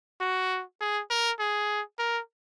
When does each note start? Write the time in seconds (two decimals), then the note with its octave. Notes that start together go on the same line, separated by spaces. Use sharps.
0.21 F#4
0.81 G#4
1.10 A#4
1.40 G#4
1.99 A#4